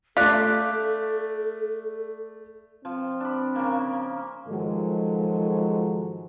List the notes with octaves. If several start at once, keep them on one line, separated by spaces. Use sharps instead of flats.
A3 F4 A4 D5 F#6 B6
F3 C4
D4 B5
C#3 A#3
G#2 D#3 F3 F#3 G#3 A4